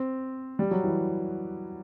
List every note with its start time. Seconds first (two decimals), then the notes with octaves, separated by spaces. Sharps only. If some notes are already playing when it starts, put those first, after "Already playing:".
Already playing: C4
0.59 G3
0.71 F#3
0.84 E3